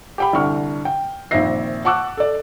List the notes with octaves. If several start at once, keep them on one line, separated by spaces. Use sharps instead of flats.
G4 G5 B5
C2 D3 C#6 F6
G5
A#1 D#3 C4 E5 A#6 C7
F#5 A5 C#6 D6 E6 F#6
A4 D5